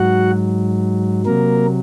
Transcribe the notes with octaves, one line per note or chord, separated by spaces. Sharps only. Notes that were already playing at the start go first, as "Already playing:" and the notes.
Already playing: G#2 F#3 F#4 F#5
C3 F#3 A#3 A#4